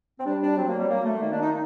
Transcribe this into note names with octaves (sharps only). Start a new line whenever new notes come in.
C4
G3 D4
D4
F#3 C4
A#3
G3
A#3
A3
D#3 A#3
D4
D#4